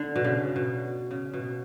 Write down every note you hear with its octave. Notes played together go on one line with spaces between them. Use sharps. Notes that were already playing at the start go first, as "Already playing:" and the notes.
Already playing: D3
B2
C#3
B2
C#3
B2